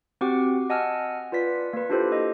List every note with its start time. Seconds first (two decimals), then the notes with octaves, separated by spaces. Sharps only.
0.21 C4 F#4 G4 F#5 C#6 D6
0.70 D#5 F#5 G#5 A5 E6 F6
1.32 F4 B4 D5 B6
1.73 A#3 B4
1.90 D4 E4 F4 G4 A4 C5
2.12 A4 D#5